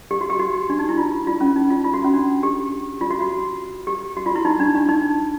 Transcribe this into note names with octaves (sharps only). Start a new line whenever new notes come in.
G4
F#4
G4
F#4
D4
D#4
E4
F4
F4
C#4
D#4
F4
F4
F#4
C#4
D4
G4
F4
F#4
F#4
G4
F#4
F4
E4
D#4
D4
D4
D#4